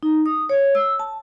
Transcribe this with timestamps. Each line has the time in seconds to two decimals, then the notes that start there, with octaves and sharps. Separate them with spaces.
0.03 D#4
0.26 D#6
0.49 C#5
0.75 E6
0.99 A5